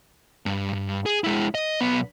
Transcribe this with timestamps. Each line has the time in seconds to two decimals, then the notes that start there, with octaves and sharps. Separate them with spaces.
0.46 G2
0.73 G2
1.06 G#4
1.24 G#3 E4
1.55 D#5
1.81 B1 B3